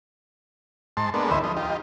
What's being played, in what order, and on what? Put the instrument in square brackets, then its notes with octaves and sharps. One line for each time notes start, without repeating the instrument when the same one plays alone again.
[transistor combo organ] G#2 A5 C6
G#3 A#3 B3 D4 A4
D2 E3 D#4 C5 E5 B5
F3 D#5
D#4 F4 G4